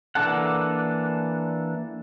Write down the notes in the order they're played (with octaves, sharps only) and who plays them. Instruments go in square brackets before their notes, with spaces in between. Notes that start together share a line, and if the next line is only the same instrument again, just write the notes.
[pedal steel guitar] E3 A#3 D4 A4 F#5